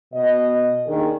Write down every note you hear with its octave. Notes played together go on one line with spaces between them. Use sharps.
B2 D#5
D#2 D#3 D4 D#4 G#4 A#4